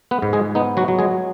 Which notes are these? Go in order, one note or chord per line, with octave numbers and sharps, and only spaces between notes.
B3 B4
G#2
G#3 G#4
B3 D#4
F#3 F#4
F#3
G#3 G#4